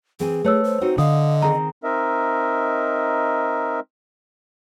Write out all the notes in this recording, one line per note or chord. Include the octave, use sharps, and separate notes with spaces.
E3 C4 G#4 G#5
A3 B4 C#5 E6
C5
C4 D#4 F#4
D3 D#5 F5 D#6
D#3 C4 G#4 A#5
C4 D#4 A#4 D#5 E5